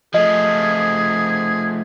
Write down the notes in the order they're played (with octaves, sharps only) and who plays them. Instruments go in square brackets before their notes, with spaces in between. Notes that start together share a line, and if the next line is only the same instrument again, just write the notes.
[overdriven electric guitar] F3 A3 [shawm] G#4 [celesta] D#5